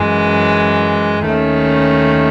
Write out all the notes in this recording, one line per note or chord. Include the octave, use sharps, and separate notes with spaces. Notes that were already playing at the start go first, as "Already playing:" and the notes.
Already playing: F#2 E3 G#3
D#2 D#3 A3 C#4